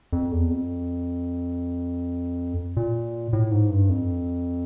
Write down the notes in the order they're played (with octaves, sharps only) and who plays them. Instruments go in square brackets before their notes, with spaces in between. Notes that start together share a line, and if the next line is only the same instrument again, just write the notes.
[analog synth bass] F2
E2
F2
A#2
A2
G#2
G2
F2